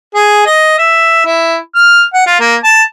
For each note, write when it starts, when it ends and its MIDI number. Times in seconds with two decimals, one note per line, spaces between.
0.15 0.42 68
0.46 0.76 75
0.78 1.23 76
1.25 1.56 64
1.75 2.03 89
2.14 2.24 78
2.27 2.40 65
2.40 2.55 58
2.64 2.82 81